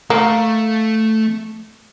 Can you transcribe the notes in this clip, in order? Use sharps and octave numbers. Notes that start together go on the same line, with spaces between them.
A3 A#3